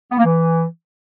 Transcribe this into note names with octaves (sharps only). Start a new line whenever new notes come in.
B3
A#3
E3